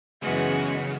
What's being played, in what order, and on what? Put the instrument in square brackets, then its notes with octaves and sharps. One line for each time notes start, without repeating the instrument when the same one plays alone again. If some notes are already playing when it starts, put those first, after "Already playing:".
[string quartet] F#2 E3 G#3 B3 F#4 [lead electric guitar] C#3